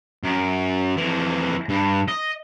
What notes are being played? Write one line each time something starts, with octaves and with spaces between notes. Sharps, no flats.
F#2
F2 E3
G2
D#5